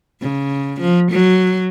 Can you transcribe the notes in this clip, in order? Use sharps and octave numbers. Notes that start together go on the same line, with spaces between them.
C#3
F3
F#3